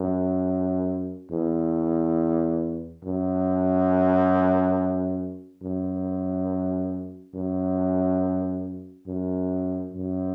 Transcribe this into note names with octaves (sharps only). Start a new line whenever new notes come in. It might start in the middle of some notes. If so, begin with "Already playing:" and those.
Already playing: F#2
E2
F#2
F#2
F#2
F#2
F#2